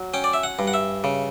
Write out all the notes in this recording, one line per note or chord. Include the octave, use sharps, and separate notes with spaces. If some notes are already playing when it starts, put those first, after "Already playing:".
Already playing: F#3
C#4 G5
D5
E5
F#5
G2
F#5
E5
C#3